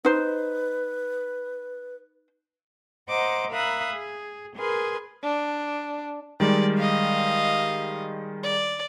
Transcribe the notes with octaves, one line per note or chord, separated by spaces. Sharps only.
D#4 B4 C5
C5 D#5 F#5 A#5 D6
A#4 E5 F5 B5 D#6 F#6
G#4
G#4 A#4 B4 C6
D4
D#3 G3 G#3 D5
D#5 F5
D5